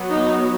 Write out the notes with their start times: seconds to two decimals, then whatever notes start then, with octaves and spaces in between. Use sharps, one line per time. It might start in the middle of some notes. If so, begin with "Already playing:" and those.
Already playing: F#3 B3
0.11 D#4